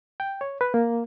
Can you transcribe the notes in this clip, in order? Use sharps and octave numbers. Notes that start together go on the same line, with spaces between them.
G5
C#5
B4
A#3